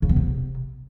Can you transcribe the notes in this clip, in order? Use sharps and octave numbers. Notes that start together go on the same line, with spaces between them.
C#3
B3
C3